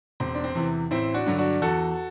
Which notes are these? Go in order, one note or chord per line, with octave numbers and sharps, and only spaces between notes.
E1 C4
D4
C4
E2 C3 E3
A1 C4 E4
D4 F#4
G2 D3 F#3
D4 F#4
E2 F#4 A4